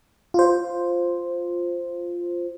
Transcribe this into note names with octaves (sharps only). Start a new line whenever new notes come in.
F4 C5